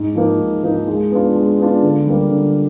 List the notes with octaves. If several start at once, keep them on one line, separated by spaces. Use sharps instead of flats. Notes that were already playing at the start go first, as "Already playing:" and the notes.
Already playing: G#2
F3 A#3 D#4
G#2
F3 A#3 D#4
G#3
B3 D4 F4
G#3
B3 D4 F4
D3
G3 A#3
D3